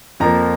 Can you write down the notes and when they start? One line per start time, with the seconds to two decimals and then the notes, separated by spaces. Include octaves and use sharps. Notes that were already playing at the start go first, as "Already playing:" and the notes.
0.20 F2 F3 A#3 A#5